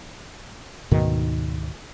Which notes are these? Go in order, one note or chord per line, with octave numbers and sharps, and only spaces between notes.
D2 G#2 B2 D#3